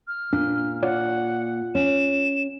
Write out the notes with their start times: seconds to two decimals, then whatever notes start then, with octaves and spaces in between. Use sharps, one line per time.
0.07 F6
0.33 A#2 D4
0.83 F4 C#5 D5 F#5
1.75 C#4 E7